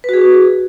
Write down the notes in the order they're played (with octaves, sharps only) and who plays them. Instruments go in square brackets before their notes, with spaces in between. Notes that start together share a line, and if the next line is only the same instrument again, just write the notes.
[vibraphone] B4
F#4
G#4